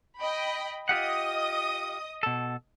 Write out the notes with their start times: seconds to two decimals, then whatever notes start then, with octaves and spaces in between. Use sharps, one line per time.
0.19 D#5 G5 B5
0.89 F4 G4 D#5 F#5 D#6
2.23 B2 A4